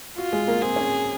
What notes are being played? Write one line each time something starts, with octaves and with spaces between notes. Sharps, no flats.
F4 F#4
G#3 G#4
A#3 A#4
C4 G#4 C5
C#4 C#5